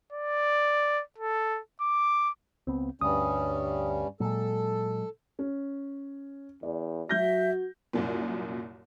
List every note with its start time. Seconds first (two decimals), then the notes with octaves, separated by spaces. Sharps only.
0.13 D5
1.18 A4
1.81 D6
2.67 C#2 B3 C4
3.01 D2 G2 G3 C#4 D#6
4.20 A#2 F#3 G#3 A4
5.39 C#4
6.63 E2 D5
7.09 F#3 F#4 E5 G6 A#6
7.93 C2 F#2 A#2